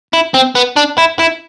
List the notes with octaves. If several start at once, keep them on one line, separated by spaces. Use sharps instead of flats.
E4
C4
B3
D4
E4
E4